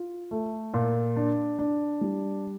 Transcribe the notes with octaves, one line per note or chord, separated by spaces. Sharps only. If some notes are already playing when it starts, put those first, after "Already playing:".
Already playing: F4
A3
A#2
D4
D4
G3